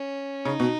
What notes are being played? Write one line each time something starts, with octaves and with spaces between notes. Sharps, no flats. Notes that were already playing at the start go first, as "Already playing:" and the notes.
Already playing: C#4
C#3 D#4
B2